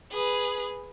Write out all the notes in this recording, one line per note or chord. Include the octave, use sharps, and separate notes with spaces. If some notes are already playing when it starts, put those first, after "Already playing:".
G#4 B4